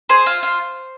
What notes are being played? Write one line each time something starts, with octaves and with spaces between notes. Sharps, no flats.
G#4 C5
F4
F4